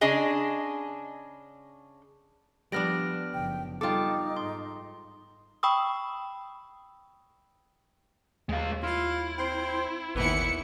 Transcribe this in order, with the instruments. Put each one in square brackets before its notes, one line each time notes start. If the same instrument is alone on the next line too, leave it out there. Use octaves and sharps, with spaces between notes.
[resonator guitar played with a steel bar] C#3 D4 G#4 D#5 G#5
[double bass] F3 [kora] G3 B3 D4 [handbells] F6 A#6 D7
[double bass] F#1 F3 [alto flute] G5
[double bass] G3 [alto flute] D#4 [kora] F4 A4 [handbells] G5 D6
[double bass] G#2 [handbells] C6
[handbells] G5 B5 C#6 D#6 E6
[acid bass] D#2 [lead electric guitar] G#3 F5
[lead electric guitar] E4 [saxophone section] F4
[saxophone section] C4 C5
[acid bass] G#1 [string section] D#2 E4 C#7 [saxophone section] D#3 E3 B3